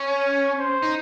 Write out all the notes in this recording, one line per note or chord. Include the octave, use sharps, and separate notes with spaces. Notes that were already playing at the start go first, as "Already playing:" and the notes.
Already playing: C#4 C#5
C5
D#4